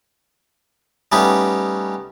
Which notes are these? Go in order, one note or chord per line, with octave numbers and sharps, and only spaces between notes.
G3 A3 B3 C#4 D#4 G4